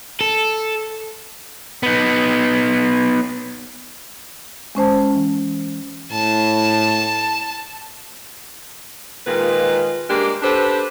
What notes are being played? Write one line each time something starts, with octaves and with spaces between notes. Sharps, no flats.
A4
B3 D#4
G#3 C#4 C5 A5
E3
A2 A5
A#2 D#3 G#3 F4 B4
G#3 A#3 D4 G4
D4 G4 A4 B4 C5